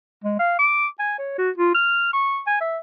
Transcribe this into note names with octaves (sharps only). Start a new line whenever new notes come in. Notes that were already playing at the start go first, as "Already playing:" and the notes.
G#3
F5
D6
G#5
C#5
F#4
F4
F6
C#6
G#5
E5